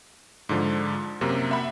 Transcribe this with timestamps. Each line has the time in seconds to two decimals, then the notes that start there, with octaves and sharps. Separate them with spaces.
0.49 G#2 D3 F3
1.21 F#2 C3 A#3
1.51 E5 F#5 B5